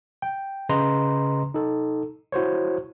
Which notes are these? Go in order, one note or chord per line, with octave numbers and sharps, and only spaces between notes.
G5
C#3 B4 D#5 A#5 C6
D#4 A4
E4 F#4 C5 C#5